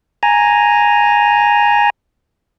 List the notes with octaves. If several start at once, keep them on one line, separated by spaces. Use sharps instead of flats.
G#5 A#5